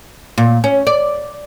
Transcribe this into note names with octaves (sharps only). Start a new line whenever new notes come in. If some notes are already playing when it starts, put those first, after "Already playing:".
A#2
C#4
D5